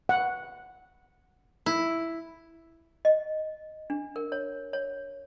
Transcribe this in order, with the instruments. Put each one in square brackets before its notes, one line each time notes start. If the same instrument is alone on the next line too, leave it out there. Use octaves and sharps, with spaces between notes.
[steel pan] F#5
[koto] E4
[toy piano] D#5
D4
A#4
C#5
C#5